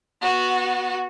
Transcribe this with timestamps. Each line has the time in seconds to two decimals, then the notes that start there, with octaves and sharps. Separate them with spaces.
0.22 B3 F#4